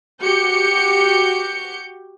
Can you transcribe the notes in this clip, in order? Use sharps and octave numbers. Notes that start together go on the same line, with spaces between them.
F#4 G4 G6 C#7